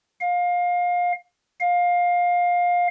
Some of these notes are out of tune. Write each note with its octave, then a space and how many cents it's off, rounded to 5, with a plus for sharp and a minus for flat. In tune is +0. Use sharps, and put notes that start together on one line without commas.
F5 +25
F5 +20